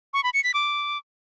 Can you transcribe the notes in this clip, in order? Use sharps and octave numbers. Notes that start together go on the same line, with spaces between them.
C#6
B5
C#7
B6
D6